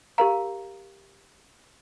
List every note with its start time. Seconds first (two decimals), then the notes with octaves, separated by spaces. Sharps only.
0.18 G4 A#4 F5 A#5